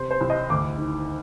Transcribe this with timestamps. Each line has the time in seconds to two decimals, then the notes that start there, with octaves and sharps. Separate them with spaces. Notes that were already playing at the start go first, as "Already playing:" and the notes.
Already playing: C3 C5
0.11 C5
0.21 C2
0.30 D#5
0.50 D2 D6
0.78 D#3